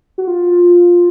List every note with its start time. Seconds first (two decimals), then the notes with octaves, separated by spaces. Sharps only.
0.18 F#4
0.28 F4